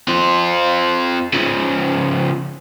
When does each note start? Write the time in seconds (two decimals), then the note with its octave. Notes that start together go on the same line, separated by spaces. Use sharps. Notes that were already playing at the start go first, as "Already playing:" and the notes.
0.08 C4 F4
1.33 C#3 F3